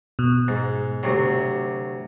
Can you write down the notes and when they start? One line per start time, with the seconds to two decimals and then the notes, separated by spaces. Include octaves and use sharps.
0.19 B2
0.48 G#2
1.03 D2 C3 F#3